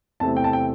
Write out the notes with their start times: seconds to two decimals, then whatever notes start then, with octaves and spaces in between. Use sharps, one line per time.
0.20 E2 C3 A3 C4 E4 A5
0.37 G5
0.44 A5
0.53 G5